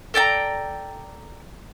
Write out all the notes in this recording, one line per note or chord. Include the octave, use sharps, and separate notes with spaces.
A4 D5 G5 A#5